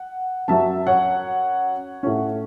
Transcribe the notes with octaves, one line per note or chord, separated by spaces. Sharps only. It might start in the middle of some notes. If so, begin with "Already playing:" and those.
Already playing: F#5
F#2 F#3 C#4 E5 A5
C#5 F#5
A2 A3 C#4